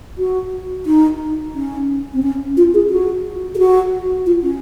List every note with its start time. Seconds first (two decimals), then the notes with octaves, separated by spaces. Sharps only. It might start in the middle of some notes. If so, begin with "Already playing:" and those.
0.18 F#4
0.86 D#4
1.55 C#4
2.14 C4
2.23 C#4
2.57 F4
2.74 G#4
2.90 F#4
3.55 G#4
3.58 F#4
4.26 F4
4.43 C#4